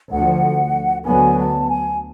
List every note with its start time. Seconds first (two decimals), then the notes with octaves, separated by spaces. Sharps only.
0.13 D2 D3 F3 F#5
1.06 D2 D3 F#3 B3 G#5
1.38 A5
1.69 G#5